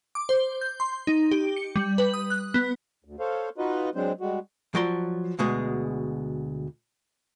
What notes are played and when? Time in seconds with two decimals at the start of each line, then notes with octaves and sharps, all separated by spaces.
0.15 D6
0.29 C5
0.61 G6
0.80 C6
1.07 D#4
1.31 G4
1.56 C#7
1.76 G3
1.98 B4
2.14 D#6
2.30 F#6
2.54 B3
3.04 D2
3.19 A4 C5 C#5 F5
3.58 D#4 F4 F#4 B4 D#5
3.95 F#3 G#3 C4 D4 C5
4.21 G3 G#3 F#4
4.75 F3 F#3 D5 A#5 C6
5.39 D2 B2 G#3 G#4